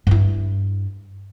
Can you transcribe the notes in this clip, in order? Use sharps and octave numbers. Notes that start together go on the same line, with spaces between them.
G2 E4